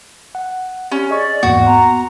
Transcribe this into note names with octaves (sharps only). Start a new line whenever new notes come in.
F#5
C#4 G4 D5
G#4 D5 D#5 C#6
E2 G#2 A#3 F#4
B3 A#5 C6